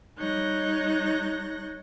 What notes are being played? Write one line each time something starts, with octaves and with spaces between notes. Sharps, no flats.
G3 D#4 C#5 F#6 G6 A#6